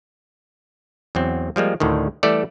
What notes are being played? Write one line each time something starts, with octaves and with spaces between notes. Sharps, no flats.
E2 F#3 C4
F3 G3 G#3 A#3
D2 A2 D3 D#3
E3 G3 A3 G4 A4 D5